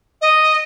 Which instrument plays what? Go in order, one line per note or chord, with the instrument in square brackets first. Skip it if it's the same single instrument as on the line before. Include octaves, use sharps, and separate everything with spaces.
[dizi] D#5